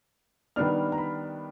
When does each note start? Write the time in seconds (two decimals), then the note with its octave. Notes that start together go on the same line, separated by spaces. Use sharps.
0.56 D#3 G3 B3 D4 F6
0.92 A#5
0.98 B5